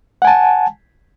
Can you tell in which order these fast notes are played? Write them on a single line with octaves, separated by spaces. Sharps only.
F#5 G#5 A5